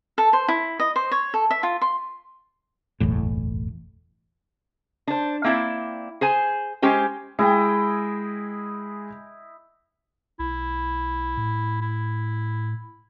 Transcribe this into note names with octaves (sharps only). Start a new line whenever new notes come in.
A4
C5
E4
D#5
C5
C#5
A4
E5
F4
C6
F#1 B1 E2 A2
D4 C5
A#3 C4 E4 D5 E5
G#4 C5 G#5
G#3 C#4 G4 C5
G#3 E4 G#4 D#5 G5
B1 E4
A2
E4